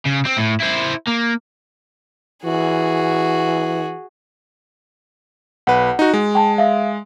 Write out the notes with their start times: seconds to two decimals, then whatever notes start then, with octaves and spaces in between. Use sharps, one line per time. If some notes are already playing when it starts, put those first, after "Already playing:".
0.05 C#3
0.25 C4
0.37 A2
0.60 E4 C5
1.07 A#3
2.45 E3 F#4 G#4
5.67 B1 B4 F#5
5.99 D#4 F#4
6.14 G#3
6.35 G5 A5
6.58 E5 F5